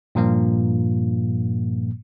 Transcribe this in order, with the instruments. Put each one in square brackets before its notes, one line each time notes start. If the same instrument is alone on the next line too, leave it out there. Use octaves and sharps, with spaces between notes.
[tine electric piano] G2 A#2 F3 A#3